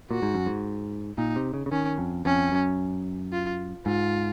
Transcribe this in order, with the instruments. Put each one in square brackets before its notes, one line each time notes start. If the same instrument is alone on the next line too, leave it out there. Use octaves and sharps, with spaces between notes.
[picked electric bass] A#2 [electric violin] F#4
[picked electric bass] G#2
F#2
G#2
[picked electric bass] A#2 [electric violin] D#4
[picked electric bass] C3
C#3
C#3
[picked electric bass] D#3 [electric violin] C#4
[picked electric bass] F2
[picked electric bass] F2 [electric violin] C#4
[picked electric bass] F#2
[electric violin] F4
[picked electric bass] G#2 [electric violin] F4